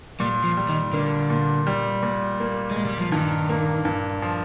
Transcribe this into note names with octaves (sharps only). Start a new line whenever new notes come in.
A#2 G3
F3
G3
D#3
D3 A#3
A#2
G3
A#2
A#3
A#2 G#3
G3
F3
G2 D#3
A#3
G2
F3